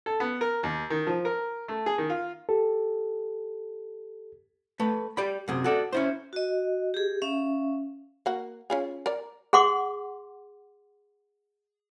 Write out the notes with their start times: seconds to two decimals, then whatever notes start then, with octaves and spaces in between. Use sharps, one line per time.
0.06 A4
0.20 B3
0.41 A#4
0.63 D#2
0.90 D#3
1.07 F3
1.25 A#4
1.68 A3
1.86 G#4
1.98 D#3
2.10 F4
2.49 G4 A4
4.80 A3 B4
5.17 G4 D5 B5
5.48 F#2 C3 G#4
5.64 F#4 A4 D5
5.93 C#4 E4 C5
6.33 F#4 D#5
6.94 G4 G#4
7.22 C#4 E5 F5
8.26 A#3 F#4
8.70 C#4 F4 G#4
9.06 A#4 D5
9.53 G#4 F#5 C6 D6